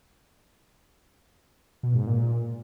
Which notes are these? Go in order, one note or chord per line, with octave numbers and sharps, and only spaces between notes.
B2
G#2
A#2